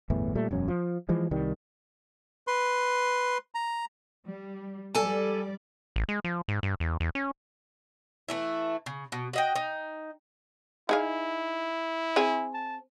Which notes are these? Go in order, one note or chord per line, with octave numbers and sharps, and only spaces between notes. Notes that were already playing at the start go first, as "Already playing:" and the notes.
G1 E2 A2 E3
A#2 G3 A3
E1 F#2 C#4
F3
E3 F3 G#3
C2 D#3 G3
B4 C6
A#5
G3
G3 A4 D5 G#5
A1
G#3
F3
G#2
G2
E2
E2
C#4
E3 A3 E4
C#3
B2
F#4 D#5 G5
D#4
D#4 E4 G#4 F5
C4 G#4 G#5
A5